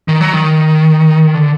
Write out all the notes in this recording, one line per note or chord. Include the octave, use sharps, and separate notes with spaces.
D#3
F#3
D#3
D3